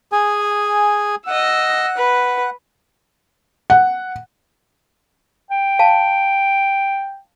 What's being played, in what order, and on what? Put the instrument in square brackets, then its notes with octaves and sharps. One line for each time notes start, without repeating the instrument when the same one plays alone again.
[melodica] G#4 G#5
[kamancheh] D#5 E6 [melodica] F#5
[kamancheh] B4
[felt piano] F#5
[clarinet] G5
[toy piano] F5 A5